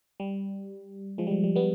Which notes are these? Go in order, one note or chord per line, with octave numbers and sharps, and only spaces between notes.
G3
F3 G#3
G3
F3
G3
G3 B3